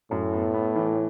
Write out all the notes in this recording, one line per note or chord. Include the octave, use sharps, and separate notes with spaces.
F#2 A2
B3
B3
E3